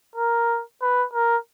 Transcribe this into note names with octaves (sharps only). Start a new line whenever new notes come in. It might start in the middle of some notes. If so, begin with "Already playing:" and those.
A#4
B4
A#4